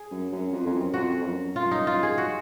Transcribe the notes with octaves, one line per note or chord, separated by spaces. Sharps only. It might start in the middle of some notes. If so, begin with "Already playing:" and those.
Already playing: G#4
F#2
F#2
F2
F2
F#2
F2 F#4
F2
F#2
F4
D#4
F4
G#4
F#4